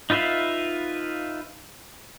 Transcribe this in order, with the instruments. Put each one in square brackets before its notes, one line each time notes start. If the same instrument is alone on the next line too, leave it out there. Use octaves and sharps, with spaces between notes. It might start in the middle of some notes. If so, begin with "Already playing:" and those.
[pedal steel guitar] D#4 F4 B4 E5 F5